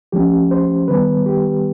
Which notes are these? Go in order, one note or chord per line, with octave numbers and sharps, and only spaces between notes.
F3 A3 C#4 G4
C5
D#3 G3 B3 B4
G4